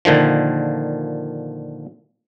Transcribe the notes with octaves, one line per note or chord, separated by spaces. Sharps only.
A#2 D3 D#3 F3